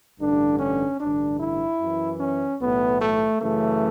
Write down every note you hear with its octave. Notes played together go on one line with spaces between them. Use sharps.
A1 G2 D3 D4
C#4
A1 G2 D3 D4
E4
F#2 E3
C#4
B1 A2 E3 B3
A3
F#2 C#3 E3 A3